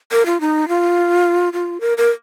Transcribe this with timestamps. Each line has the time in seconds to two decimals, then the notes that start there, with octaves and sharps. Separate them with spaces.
0.12 A#4
0.26 F4
0.41 D#4
0.68 F4
1.53 F4
1.81 A#4
1.98 A#4